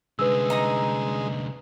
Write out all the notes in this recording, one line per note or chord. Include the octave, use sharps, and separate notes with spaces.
C2 D3 G#3 B4 E6
D#4 A#5 D#6